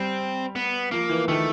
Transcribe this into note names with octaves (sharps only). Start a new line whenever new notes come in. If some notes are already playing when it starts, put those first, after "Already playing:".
Already playing: G3 C4
B3
F3 A#3
E3
D#3 A3